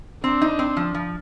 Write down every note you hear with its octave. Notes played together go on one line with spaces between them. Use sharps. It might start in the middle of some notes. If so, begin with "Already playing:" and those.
C4 D4
D#4
C4
F3
F3